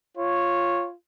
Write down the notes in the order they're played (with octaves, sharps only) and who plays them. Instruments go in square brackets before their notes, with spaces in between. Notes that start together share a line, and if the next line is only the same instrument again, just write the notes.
[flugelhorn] F4 [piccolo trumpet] C#5